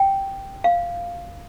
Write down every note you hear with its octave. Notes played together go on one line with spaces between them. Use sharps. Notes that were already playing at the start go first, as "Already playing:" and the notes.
Already playing: G5
F5